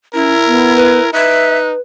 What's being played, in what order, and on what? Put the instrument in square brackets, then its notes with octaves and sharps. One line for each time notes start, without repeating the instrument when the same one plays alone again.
[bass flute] C#4 [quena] E4 [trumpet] A#4
[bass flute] B3
[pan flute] B4
[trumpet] D#4 [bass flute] B4 [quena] E5 [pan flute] F#6